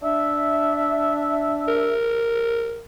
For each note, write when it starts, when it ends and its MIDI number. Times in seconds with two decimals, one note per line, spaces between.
0.02 1.93 62
0.02 1.93 76
1.68 2.84 70